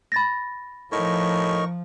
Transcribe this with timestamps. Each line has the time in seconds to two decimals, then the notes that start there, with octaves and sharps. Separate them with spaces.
0.12 B5 A6 A#6
0.92 A2 F3 D#4 A#4 C#6